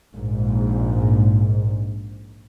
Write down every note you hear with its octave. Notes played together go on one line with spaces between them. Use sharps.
A#1 G#2